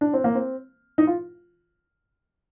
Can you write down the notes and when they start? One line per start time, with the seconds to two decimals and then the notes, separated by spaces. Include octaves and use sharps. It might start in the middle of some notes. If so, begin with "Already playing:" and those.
0.01 D4
0.13 C4
0.24 A#3
0.35 C4
0.98 D#4
1.07 F4